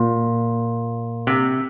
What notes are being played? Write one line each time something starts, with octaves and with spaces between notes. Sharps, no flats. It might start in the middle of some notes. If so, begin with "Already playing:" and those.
Already playing: A#2
C3